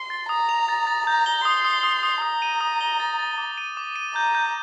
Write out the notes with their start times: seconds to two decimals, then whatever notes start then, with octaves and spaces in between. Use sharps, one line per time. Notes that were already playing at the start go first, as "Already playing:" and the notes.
Already playing: C6
0.10 A6
0.29 A#5 D#6
0.49 F7
0.69 A6
0.87 A6
1.06 A#5 G6
1.26 G7
1.45 C6 D#6
1.65 D#6
1.83 D#6
2.03 D#6
2.22 A#5 D#6
2.42 D#7
2.61 D#6
2.81 G7
3.00 A6
3.19 A6
3.38 D6
3.57 D#7
3.77 D6
3.96 D#7
4.15 A#5 G6
4.35 G6